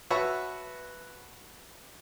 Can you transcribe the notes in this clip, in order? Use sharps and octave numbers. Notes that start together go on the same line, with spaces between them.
F#4 B4 C#5 E5 F#5 A5